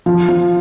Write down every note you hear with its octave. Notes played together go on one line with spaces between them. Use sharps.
F3
F3